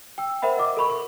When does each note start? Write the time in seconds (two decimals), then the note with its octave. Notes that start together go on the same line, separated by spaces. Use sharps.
0.18 G5 E6
0.42 A#4 C5 E5 F#5 B5
0.57 D#5 D6
0.77 A4 A#4 B5 C#6
0.90 C#6